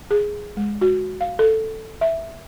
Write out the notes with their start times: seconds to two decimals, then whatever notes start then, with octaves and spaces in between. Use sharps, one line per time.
0.11 G#4
0.57 G#3
0.81 F#4
1.21 F5
1.39 A4
2.01 E5